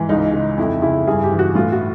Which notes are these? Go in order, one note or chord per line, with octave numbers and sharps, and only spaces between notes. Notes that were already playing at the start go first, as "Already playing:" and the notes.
Already playing: G#2 E3
C#2 D#4
C#3
F2 E4
C#3 E4
G2 G#4
G4
E3
F#4
A2 F4
F#4